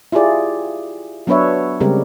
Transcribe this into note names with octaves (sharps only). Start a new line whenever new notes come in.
E4 F4 G4 G#4 D5
F#3 B3 D4 B4 C#5 E5
C#3 G3 G#3 C4 G4 A#4